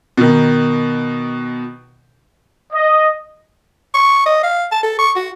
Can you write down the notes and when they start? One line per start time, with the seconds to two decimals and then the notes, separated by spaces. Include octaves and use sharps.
0.17 B2 D#3
2.73 D#5
3.94 C#6
4.26 D#5
4.43 F5
4.71 A5
4.83 A4
4.99 C#6
5.16 F#4